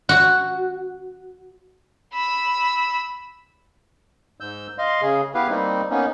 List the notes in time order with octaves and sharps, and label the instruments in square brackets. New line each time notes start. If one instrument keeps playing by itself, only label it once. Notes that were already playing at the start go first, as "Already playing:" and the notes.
[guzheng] F#4
[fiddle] B5 E6
[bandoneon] G#2 E6 G6
D#5 F5 C6
C#3 G#4
B3 E4 G4 B4 F5
G3 A#3 C4 D#4
A#3 B3 C#4 D#4